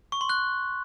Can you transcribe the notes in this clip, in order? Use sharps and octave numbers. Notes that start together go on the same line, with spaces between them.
C#6
C6
F#6